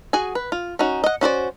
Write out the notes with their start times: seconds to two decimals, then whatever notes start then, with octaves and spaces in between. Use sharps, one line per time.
0.13 F#4 G#4 G#5
0.35 B4
0.52 F4
0.79 C#4 D#4 F#4
1.04 D#5 F#5
1.21 C#4 F#4 C5 D5